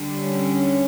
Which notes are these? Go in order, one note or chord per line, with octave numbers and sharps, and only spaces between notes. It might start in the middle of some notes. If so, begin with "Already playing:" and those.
Already playing: D3 G3
C#4